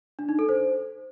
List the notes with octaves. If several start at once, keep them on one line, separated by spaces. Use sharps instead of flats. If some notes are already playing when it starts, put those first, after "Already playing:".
D4
D#4
A4
C5